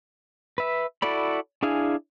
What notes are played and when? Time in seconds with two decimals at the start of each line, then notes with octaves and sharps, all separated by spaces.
0.58 B4 E5
1.02 E4 F#4 A4 D5 B5
1.63 D4 E4 G#4 F5 G#5